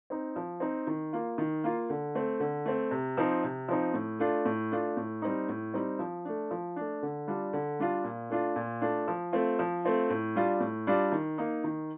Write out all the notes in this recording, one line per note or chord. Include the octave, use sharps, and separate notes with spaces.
C4 D#4
F3
C4 D#4
D#3
A#3 F4
D#3
A#3 F4
D3
A3 C4
D3
A3 C4
C3
F3 C4 D#4
C3
F3 C4 D#4
A2
A3 D4 F4
A2
A3 D4 F4
A2
G3 C4 D#4
A2
G3 C4 D#4
F3
A3 D4
F3
A3 D4
D3
G3 D4 F4
D3
G3 D4 F4
A#2
A3 D4 F4
A#2
A3 D4 F4
F3
A3 C4 F4
F3
A3 C4 F4
A2
G3 D4 F4
A2
G3 D4 F4
D#3
A#3 D#4
D#3